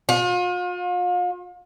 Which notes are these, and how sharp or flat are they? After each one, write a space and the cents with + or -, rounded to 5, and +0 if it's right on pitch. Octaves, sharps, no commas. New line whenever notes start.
F4 +40